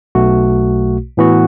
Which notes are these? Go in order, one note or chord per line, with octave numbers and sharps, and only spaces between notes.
B1 B2 A3 F#4
A2 E3 B3 F#4